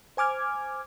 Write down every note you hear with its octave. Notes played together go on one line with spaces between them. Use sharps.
C5 G#5 D6 F6 G#6